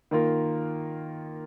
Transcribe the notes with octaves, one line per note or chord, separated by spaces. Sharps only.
D#3 A#3 F4 A#4